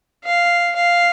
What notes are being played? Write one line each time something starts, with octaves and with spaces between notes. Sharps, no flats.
F5
F5